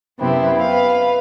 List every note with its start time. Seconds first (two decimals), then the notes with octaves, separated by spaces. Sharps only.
0.19 F#2 C3 B3 C4 E4
0.60 B4 F5